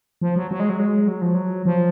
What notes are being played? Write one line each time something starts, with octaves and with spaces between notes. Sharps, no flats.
F3
F#3
F#3
G#3
F#3
G#3
F#3
F3
F#3
F3